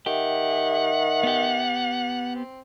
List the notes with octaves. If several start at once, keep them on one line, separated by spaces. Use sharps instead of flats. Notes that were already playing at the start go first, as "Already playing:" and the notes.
D#3 G4 E5 F#5
B3 G4
C4